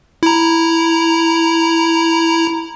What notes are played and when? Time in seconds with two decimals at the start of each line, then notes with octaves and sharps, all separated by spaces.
0.23 E4 A#5